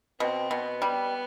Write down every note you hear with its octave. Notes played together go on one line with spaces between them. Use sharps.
B2 C4
B2 B3
G3